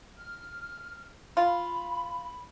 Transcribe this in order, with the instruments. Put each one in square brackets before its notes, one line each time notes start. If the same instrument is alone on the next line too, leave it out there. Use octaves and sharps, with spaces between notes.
[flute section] F6
[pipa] F4 [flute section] B5